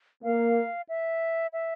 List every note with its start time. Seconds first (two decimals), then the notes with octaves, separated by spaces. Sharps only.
0.23 A#3 F5
0.89 E5
1.53 E5